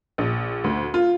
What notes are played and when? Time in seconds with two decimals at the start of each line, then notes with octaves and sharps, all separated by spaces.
0.18 A#1
0.64 D2
0.94 F4